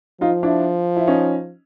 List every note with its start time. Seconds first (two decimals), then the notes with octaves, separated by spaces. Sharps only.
0.21 F3 D#4 F4
0.43 D4 E4
0.97 E4
1.07 C#4 D#4